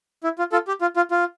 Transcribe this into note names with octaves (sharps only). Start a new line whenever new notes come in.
E4
F4
F4 A4
G4
F4
F4
F4